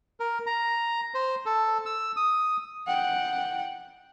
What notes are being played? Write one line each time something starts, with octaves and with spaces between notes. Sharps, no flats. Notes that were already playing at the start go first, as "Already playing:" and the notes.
A#4
A#5
C5
A4
E6
D#6
F#5 G5